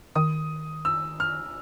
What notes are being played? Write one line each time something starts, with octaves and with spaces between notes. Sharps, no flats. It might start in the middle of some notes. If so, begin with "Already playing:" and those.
D#3 D#6
E6
F6